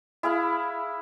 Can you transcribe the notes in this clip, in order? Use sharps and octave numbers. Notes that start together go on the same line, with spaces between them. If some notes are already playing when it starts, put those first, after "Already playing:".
E4 G#4 F5 B5